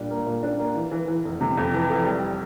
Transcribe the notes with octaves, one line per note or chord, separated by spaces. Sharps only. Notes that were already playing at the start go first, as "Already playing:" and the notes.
Already playing: A#2 G3 D4
A#3
A#2
D4
A#3
E3
E3
E3
F1
C3
F2
E3
F1
G3